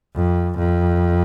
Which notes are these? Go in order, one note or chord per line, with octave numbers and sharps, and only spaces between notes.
F2
F2